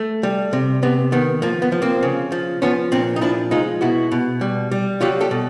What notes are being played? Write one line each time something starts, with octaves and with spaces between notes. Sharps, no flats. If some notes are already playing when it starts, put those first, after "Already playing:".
Already playing: A3
G3
C3
C3 B3
D#3 B3
F3 A#3
B3
F3
A#3 C4
C#3
F3
F3 B3 C#4
A#2 C4 D4
D#4
F3 D4 E4
G#3 D#4 F4
B2 E4 F#4
B2
G3
G3
F#3 F4 G4
G4 A4
B2